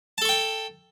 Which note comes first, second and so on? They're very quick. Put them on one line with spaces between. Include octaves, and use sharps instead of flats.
A5 A4 C#6 G5